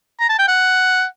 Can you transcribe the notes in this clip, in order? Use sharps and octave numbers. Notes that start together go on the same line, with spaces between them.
A#5
A5
G5
F#5